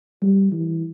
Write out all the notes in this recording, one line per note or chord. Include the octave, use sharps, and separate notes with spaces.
G3
E3